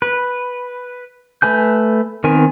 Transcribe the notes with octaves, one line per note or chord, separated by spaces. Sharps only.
B4
A3 B4 G#5 G6
D#3 B3 C4 A#4 G#5